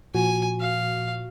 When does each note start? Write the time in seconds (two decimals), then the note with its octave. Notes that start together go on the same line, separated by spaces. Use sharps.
0.15 A#2 F3 F#4 G#5
0.61 F5